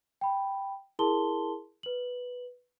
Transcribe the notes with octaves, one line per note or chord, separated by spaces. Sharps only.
G5 B5
E4 G#4 A#4 A5 C6 G7
B4 F#7